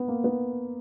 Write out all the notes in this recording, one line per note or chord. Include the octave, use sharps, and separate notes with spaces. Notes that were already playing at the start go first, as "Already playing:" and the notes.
Already playing: B3
A#3
B3